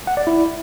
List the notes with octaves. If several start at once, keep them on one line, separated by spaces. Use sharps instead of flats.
F#5
D5
E4